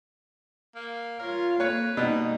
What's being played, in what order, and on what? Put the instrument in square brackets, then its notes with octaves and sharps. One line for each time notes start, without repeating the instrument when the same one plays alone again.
[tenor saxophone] A#3
[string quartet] F4 C#5 F5 [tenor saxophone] A#4
[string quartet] F2 A#3 [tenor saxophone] B4 [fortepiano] C#5
[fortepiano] B2 [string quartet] G3 A#3 D#4